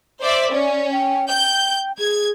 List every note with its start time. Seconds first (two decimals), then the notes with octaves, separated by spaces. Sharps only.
0.21 C5 D5 E5
0.51 C#4 D5
0.92 G5
1.29 G5 G6
1.99 G#4 G#6